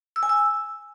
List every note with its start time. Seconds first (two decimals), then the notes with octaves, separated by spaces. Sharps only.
0.16 E6
0.23 G#5
0.29 E6